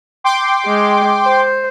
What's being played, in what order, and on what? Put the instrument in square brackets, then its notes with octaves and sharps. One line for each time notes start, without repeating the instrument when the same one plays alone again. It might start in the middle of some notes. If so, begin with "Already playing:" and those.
[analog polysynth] G5 C6 D6
[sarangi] G#3
C5